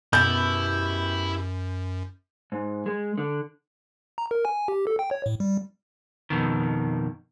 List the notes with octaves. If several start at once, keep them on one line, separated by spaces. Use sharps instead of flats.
F#2 B2 E4 G4 G6
G#2
G#3
D3
A#5
A#4
G#5
G4
A4
G5
C#5
A2
G3
F2 B2 D#3